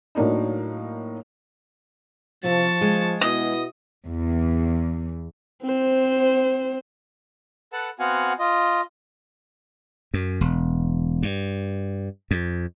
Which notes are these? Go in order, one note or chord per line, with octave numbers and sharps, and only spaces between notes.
A2 F#3 A#3 D4 D#4
C3 F3 A5 C#6
G#3
B2 E4 D#5 D#6
E2
C4 C5
A4 B4 F#5 A5
B3 C4 F#4 F5 F#5 G#5
F4 D#5
F#2
E1
G2
F2